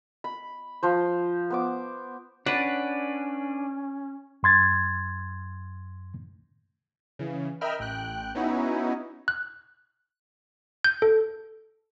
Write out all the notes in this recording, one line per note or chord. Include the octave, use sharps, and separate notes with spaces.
B5
F3 C5
B3 C5 D6
C#4 D4 B4 C#5 D5 F#5 A5
F#2 C6 G#6 A6
C#3 E3
A#4 D#5 E5 G5 B5 F6
A1 G5 F#6
B3 C#4 D#4 E4 F#4
F#6
G6
A4